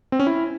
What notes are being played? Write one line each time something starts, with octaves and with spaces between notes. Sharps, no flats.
C4
C#4
E4